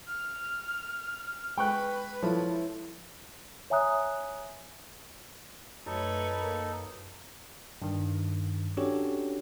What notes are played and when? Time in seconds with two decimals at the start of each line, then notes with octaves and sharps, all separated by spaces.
0.07 F6
1.58 G#3 B4 G5 C#6 F#6
2.23 F3 E4 A4 C#5
3.70 C#5 E5 G#5 A#5 D#6 F#6
5.86 F#2 F#3 A3 D#4 A4 B4 C#5
6.41 A#3 A#4
7.82 G2 D#3
8.77 C#4 D4 F#4 G4 A4 C#5